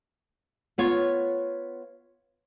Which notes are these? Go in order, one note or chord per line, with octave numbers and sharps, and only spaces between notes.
B3 F4 C#5